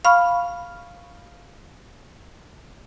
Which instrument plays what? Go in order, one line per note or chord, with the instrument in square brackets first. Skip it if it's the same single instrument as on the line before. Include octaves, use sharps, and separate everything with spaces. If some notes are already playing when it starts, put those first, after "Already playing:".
[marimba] F5 B5 C#6 F6